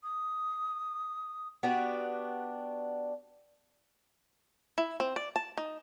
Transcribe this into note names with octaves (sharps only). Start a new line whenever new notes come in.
D#6
B3 D4 F#4 G4
E4
C4
D5
A5
D#4